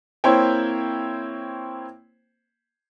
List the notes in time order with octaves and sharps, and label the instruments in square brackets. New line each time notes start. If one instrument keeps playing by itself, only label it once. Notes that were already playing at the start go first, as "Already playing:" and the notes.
[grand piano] A#3 C4 E4 C5 C#5 G5